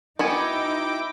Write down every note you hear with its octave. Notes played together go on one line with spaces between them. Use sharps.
B3 D#4 E4 F#4 G5 G#5 D6